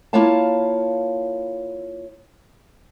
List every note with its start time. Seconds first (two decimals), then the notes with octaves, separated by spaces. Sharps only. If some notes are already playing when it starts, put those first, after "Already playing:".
0.13 A#3 E4 F4 C#5 F5 A5